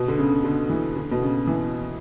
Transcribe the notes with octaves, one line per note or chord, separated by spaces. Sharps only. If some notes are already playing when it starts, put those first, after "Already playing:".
Already playing: B2
D3
C#3
D3
E3
D3
B2
C#3
E3